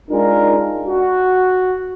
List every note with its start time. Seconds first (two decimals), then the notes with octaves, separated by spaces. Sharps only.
0.10 G#3 D4 D#4 F4 A#4
0.86 F#4